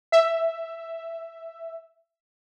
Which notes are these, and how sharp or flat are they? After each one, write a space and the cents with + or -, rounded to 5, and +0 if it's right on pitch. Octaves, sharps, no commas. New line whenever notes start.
E5 +0